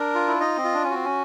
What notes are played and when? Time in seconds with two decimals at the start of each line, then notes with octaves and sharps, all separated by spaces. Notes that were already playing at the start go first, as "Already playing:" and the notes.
Already playing: D4 A#4
0.15 F4
0.27 E4
0.40 D#4 D#5
0.57 C4
0.64 F4
0.74 D4
0.84 C#4
0.90 C4 F#4
1.05 C#4